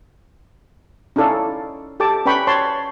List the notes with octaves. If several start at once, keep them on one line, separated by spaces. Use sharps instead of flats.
C#4 D#4 E4 A4 D5 F5
G4 A4 A5 D6
C#4 B4 D5 G5 B5 C#6
C#5 A5 C6